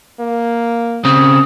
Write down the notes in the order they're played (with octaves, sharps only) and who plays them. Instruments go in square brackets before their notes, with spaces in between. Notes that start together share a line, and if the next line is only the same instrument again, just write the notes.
[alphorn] A#3
[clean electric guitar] C#3 C4 [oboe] D#6